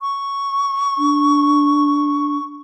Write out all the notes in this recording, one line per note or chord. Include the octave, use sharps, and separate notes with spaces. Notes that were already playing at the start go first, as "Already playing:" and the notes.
C#6
D4